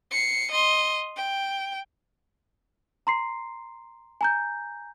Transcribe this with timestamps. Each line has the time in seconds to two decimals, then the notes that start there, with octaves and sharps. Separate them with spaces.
0.11 C7 C#7
0.51 D#5 C6
1.16 G5
3.07 A#5 C6 C7
4.21 G#5 A#5 G6